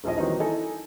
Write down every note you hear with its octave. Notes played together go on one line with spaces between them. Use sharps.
D#1 A#1 F3 E4 D#5
D#3 E3 F#3 G3 C4 D#4
D#4 E4 A4 G#5